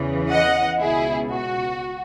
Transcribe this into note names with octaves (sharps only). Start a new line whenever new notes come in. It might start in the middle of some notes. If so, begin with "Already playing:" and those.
Already playing: E2 C#3 E3
D#5 F#5
C#2 B2 E4 G#4
F#4